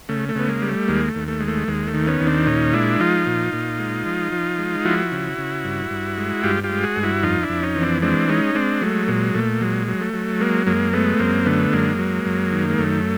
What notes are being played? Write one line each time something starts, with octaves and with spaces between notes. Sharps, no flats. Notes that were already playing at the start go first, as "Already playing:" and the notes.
C#3 A3
A3
C#3 B3
G#3 A#3
G3
A3
D#2 G#3 A#3
A3
D#2
A3
G#3
A3
D#2 G#3
A3
D#3
B3 C#4
D#2
C4 D4
A#2 C#4 D#4
G#3 D4 E4
F3 D#4 F4
A#2
A#2
G#3
F3
F3
G#3
F3 E4 F#4
C#3
C#3
G2
G2
G#3
G2 F4 G4
F4 G4
G#3
F#4 G#4
G2
E4 F#4
F2 D#4 F4
D4 E4
F2
C#4 D#4
E3
C4 D4
G#3 C4 D4
G#3 C#4 D#4
G#3 C4 D4
F#3 A3
A#2 G#3
A#2 A3
F#3 G#3
F#3
A3
F#3
G#3 A#3
F#2 G#3 A#3
G#3 A3 B3
F#2 A#3 C4
D3 A3 B3
F#2 G#3 A#3
F#3
F#2
D#3
G#3
F#2 A3